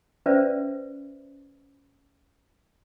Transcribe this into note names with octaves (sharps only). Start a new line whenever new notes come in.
C#4 B4 C5 D5 E5